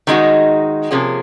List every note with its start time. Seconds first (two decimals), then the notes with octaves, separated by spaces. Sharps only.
0.07 D#3 G#3 D#4 F#4
0.91 C3 F3 A#3 C#4 G#4